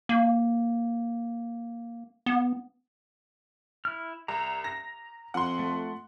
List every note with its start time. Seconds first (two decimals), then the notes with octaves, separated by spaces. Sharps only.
0.09 A#3
2.26 B3
3.85 E4 F6
4.28 C2 A#5
4.64 A#6
5.34 F2 F#5 C6
5.59 A3